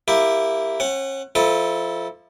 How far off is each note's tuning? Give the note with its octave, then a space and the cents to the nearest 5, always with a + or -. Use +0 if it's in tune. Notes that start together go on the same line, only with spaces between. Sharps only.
A#3 +0 E4 +0 G4 +15
C#4 -40 F#5 +10
F3 -15 E4 -30 A4 +0